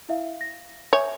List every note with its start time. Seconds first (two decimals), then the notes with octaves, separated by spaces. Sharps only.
0.09 E4 E5 F5
0.41 A#6
0.93 C#5 E5 G#5 G6